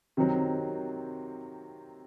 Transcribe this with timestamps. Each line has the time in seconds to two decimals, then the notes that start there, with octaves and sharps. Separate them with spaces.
0.17 C3 D#3 F#3 C4